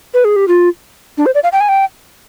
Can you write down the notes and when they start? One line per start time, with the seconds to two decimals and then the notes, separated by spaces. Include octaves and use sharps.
0.14 B4
0.24 G#4
0.36 G4
0.48 F4
1.18 D4
1.26 C5
1.35 D5
1.43 F5
1.52 G5
1.60 G#5
1.69 G5